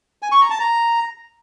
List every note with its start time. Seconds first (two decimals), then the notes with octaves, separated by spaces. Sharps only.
0.22 G#5
0.32 C#6
0.41 A#5
0.50 A5
0.60 A#5